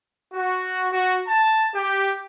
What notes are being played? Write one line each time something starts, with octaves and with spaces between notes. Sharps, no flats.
F#4
F#4
A5
G4